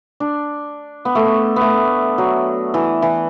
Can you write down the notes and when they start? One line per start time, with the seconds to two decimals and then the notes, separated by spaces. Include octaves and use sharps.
0.20 D4
1.05 B3
1.15 A3
1.25 B3
1.56 A3 B3
2.18 F#3
2.74 E3
3.02 E3